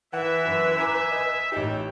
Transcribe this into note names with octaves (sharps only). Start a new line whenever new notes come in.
E3 B4 E5 F#5
F#2
G#5 A#5 D6
D#5
A1 D#4 G4